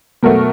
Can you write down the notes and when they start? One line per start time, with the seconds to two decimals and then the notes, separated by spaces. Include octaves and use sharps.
0.23 B2 F#3 A3 A#4